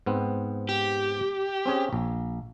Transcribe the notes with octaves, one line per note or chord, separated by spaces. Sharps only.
G#2 B3 C4
G4
C4 C#4 G#4
A#1